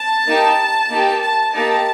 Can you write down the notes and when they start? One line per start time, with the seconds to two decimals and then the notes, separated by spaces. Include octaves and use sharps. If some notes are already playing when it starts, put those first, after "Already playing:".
Already playing: A5
0.26 A#3 D#4 G4
0.89 A#3 D#4 G4
1.21 A5
1.53 A#3 D#4 G4 A5